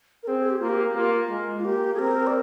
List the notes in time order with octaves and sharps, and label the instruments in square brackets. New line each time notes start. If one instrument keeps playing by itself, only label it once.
[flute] A#4
[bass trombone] C4 [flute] G#4
[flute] G#4
G4
[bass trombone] A#3 [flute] F4
[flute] G4
[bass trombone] A#3 [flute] F4
[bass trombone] G#3
[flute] F4
[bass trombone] A#3 [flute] G4
[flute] G#4
[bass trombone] C4 [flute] A#4
[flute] D5